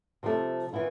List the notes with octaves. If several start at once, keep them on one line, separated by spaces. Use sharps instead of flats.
C3 F3 G3 A3
D#3 E3 B3 E4 F4